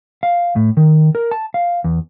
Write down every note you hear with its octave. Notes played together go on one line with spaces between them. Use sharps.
F5
A2
D#3
A#4
A5
F5
E2